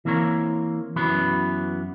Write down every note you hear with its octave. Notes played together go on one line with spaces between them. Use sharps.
E3 A#3 C4 A#4 C#5
F#2 E3 F#3 B3 B4 B5